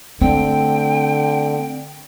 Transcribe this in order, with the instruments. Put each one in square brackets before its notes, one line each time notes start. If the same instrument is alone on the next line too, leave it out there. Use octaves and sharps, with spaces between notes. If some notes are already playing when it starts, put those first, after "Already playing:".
[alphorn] D3 [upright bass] A3 [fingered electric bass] C4 [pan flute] G5